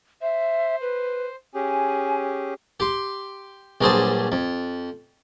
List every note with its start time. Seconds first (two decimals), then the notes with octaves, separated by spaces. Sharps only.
0.22 C5 E5
0.81 B4
1.54 C#4 G4 G#4 G#5
2.80 G4 C6
3.81 A#1 G2 F#3 G#4 C5 A5
4.32 F2